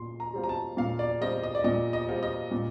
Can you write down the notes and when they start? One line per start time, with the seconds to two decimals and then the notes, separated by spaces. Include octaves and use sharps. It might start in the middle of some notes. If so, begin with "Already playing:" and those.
Already playing: A#2 C6
0.20 A#5
0.34 G3 C4 F4
0.44 A#5
0.49 A5
0.77 A#2 F5
0.99 D5
1.21 G3 C4 F4 D#5
1.44 D#5
1.55 D5
1.64 A#2 D#5
1.93 D#5
2.09 G3 C4 F4
2.23 D#5
2.51 A#2